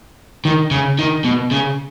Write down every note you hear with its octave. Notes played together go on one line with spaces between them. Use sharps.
D#3
C#3
D#3
B2
C#3